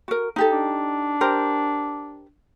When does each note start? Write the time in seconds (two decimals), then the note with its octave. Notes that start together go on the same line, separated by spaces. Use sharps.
0.08 F#4 A#4
0.36 D#4 G4 A4
0.52 D4
1.21 G4 A#4 C5